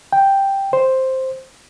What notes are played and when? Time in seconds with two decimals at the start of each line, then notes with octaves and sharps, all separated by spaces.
0.13 G5
0.73 C5